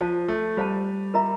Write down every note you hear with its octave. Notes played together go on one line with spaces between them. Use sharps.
F3 C5 F5 A5
A3
G3 C5 F5 A5
F4 A#4 E5 A#5